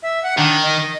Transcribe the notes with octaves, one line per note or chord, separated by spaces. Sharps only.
E5
F#5
D#3 D4
D#5